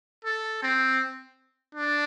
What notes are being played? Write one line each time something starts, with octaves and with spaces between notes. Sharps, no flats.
A4
C4
D4